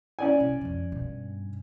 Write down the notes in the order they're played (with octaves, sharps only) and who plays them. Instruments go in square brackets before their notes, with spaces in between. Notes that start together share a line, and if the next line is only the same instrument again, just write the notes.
[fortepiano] C#4 D5 G#5
[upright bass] C3
F2 F3
G2 B2